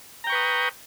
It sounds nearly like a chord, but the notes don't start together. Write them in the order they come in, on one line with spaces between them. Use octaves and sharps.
A#5 G5 C#6 B4 D#6